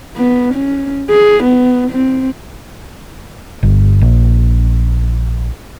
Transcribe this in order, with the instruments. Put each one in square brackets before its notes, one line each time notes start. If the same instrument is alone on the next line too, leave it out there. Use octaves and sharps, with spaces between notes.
[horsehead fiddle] B3
C#4
G#4
B3
C4
[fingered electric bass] G1
A#1